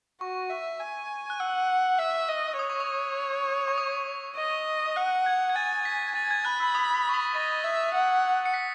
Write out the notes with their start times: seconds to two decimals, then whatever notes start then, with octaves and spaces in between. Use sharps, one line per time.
0.21 F#4 C#6
0.50 E5
0.80 G#5
1.30 F#6
1.40 F#5 E6
1.99 E5
2.29 D#5
2.59 C#5 D#6
2.70 C#6
2.80 D#6
3.68 C#6
3.78 D#6
4.37 D#5
4.96 F#5 F#6
5.26 G#6
5.50 G#6
5.56 G#5 A6
5.85 B6
6.15 G#5 A6
6.31 G#6
6.45 B5 F#6
6.60 E6
6.75 D#6
6.95 D#6
7.09 C#6
7.14 D#6
7.34 D#5 A6
7.64 E5
7.94 F#5
8.45 C#7
8.54 B6